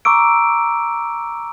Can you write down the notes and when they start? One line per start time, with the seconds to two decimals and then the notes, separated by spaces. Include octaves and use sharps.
0.05 A#5 C#6 D6 E6 D7